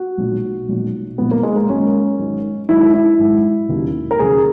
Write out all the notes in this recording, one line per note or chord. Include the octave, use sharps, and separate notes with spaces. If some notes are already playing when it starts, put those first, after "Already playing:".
Already playing: F#4
B1 A#2 F#3
B1 A#2 F#3
B1 A#2 F#3 B3
A#3
G#3
A#3
G#1 G#2 F#3 C#4
G#1 G#2 F#3
G#1 G#2 F#3 E4
E4
G#1 G#2 F#3
D#2 C#3 F#3
A#4
D#2 C#3 F#3 G#4